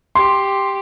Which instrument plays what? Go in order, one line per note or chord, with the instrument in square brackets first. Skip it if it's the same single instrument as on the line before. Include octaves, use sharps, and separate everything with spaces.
[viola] G4 [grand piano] C6